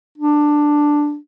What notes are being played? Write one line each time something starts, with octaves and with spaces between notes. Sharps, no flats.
D4